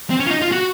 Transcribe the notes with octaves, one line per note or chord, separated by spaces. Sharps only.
C4
C#4
F4
D#4
F4
F#4